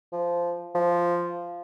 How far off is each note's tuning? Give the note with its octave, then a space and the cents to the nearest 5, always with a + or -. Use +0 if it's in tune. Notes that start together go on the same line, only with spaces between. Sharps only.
F3 -10
F3 -5